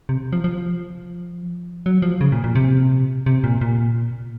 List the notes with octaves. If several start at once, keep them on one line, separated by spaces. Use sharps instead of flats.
C3
F3
F3
F#3
F3
C#3
A#2
A#2
C3
C3
A#2
A#2